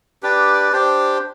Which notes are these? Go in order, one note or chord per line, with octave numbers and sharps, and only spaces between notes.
D4 G4 B4 D5
D4 G4 C5